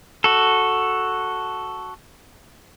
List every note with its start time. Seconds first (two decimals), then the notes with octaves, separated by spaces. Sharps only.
0.24 F#4 A4